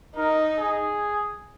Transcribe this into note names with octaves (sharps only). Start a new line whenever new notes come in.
D#4 A#4
G#4